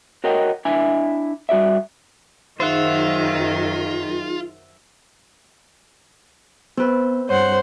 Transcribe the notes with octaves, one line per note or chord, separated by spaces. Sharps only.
F#4 A#4 C#5 D#5 F#5 G5
D4 E4 E5 G#5
G3 F#4 D5 E5
F#2 D#3 D#4 F4 G#4 C5 E5 F#5
B3 C4 B4
G2 C5 C#5 F#5